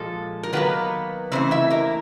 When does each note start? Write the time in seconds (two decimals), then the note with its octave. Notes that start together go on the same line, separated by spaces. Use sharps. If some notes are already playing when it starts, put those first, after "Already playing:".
Already playing: A#2 F3 G#3 A4
0.43 A#4
0.53 D#3 F#3 A#3 B3 B4
1.32 C#3 E3 A3 C4 C5
1.51 E4 E5
1.70 A#3 A#4